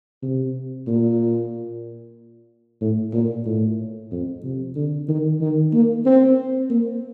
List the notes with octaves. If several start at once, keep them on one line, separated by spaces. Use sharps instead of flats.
C3
A#2
A2
A#2
A2
F2
C3
D3
D#3
D#3
A#3
C4
A#3